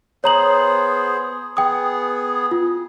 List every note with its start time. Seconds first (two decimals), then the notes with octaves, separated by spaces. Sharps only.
0.24 B3 G#4 C5 C#5 A#5 F#7
1.57 B3 G#4 G5 D#6
2.51 F4